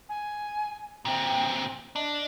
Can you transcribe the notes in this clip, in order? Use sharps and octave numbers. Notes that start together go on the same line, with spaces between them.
G#5
A#2 C4 G5
D4 D#5